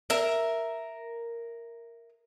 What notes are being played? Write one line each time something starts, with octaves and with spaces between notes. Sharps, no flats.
A#4 E5